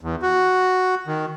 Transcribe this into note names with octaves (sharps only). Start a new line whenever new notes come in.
E2
F#4
D#3